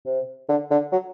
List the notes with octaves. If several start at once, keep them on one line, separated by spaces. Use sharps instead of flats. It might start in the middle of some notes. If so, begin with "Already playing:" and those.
C3
D3
D3
F#3